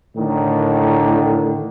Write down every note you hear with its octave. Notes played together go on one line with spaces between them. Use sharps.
A2 D3 D#3